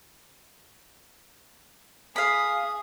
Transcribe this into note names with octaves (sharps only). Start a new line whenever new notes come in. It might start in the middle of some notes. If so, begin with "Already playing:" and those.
G#4 F5 B5 D#6